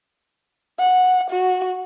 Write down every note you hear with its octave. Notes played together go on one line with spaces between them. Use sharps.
F#5
F#4